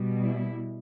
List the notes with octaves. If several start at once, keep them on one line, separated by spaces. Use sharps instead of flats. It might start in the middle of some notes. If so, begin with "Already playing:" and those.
Already playing: B2 G3
E4